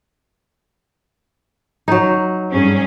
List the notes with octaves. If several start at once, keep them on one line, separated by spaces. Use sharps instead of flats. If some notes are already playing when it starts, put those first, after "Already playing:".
F#3 D#4
G2 C#4 G#4